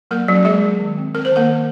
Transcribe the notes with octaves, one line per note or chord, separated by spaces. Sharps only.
F#3 A#3 A#4
F#3 C#4 F#4
G#3 A#3 G#4
F#3
D#3
C4
C4 A#4
C5
D#3 A#3 A#4
D#3